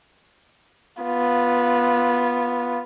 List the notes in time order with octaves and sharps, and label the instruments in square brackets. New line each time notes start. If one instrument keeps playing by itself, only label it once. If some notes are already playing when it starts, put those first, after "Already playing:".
[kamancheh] B3 F4